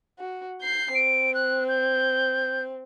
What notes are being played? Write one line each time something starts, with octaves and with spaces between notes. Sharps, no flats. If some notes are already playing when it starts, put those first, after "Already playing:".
F#4
G6 C7
C4 D7
F#6
G6